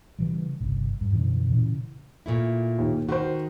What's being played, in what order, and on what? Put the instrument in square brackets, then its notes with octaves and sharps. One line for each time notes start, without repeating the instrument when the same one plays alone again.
[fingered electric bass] C#3 E3 G3
G1 C2
G2
F#2 B2 D3 E3
A#2 C#3 E3
[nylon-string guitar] A#2 A3 E4
[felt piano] D#2
[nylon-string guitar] D#3 [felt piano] F#4 C5